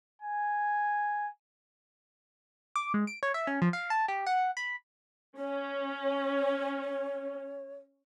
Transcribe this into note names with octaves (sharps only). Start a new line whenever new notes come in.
G#5
D6
G#3
D7
C#5
E5
C#4
F3
F5
A5
G4
F#5
B5
C#4 C#5